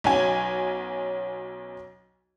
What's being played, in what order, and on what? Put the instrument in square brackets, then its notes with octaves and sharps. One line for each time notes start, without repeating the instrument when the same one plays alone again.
[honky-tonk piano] B1 F#3 C#4 G#5